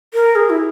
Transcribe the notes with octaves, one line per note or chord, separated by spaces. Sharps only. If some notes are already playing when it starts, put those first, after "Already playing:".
A#4
G#4
E4